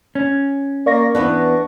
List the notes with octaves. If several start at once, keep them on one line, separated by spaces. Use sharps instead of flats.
C#4
A#3 D5 C#6 A#6
E2 B3 D4 B4